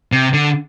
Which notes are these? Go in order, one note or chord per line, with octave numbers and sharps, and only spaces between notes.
C3
D3